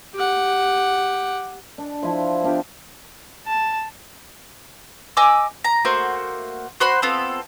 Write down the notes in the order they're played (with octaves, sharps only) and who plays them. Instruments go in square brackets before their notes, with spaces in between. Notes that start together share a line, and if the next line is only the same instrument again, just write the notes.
[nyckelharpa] G4 F#5
[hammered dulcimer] D4
F3 E4
B3 D4 F4 G4
[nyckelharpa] A5
[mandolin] D#5 G#5 D6 E6
A#5
A3 A#3 F#4 C5
F#4 C5 B5 C6
B3 C4 F4 A4